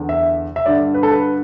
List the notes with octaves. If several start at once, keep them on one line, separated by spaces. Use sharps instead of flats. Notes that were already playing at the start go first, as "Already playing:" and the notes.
Already playing: E2 D3
E5
E5
G2 D3 D5
B4
A4
B4